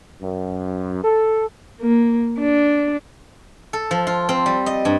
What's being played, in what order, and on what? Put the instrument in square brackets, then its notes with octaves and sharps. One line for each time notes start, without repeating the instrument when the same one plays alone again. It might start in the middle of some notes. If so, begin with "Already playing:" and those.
[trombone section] F#2
A4
[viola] A#3
D4
[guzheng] A4
F3
F4
C4
G3
D#5
G2